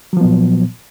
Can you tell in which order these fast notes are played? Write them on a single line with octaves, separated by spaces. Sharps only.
F#3 F3 B3 A#2